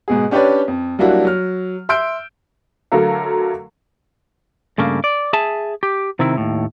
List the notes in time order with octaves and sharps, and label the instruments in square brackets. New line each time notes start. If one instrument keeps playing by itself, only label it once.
[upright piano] G#2 B2 G#4
C#4 D4 G4 B4 C#5 D5
F2
F#3 G3 A#3 D4 E4 F#4
F#3 F6
E5 C6 E6 G6 D7
[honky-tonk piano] D3 F#3 A3 A4 A#4 F5
[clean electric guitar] G2 C#3 A3 A#3
D5
G#4 E5 G#5 A5
G4
C3 D#3 C4 E4
D#2 A2